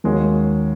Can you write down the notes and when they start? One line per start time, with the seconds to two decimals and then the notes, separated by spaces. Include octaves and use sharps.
0.04 D#2 D#3 G#3 C#4 F#4